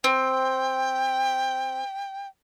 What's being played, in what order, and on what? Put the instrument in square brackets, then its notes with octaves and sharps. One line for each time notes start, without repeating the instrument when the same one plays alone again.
[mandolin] C4 [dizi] G5